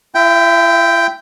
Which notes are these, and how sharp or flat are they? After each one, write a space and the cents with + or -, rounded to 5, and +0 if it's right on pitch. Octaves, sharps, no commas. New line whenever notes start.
E4 +45 E5 -5 G5 +0